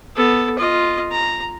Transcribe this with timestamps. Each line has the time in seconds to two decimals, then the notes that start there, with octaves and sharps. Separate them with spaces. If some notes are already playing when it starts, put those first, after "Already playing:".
0.16 B3 A4
0.58 F4 D#5
1.12 A#5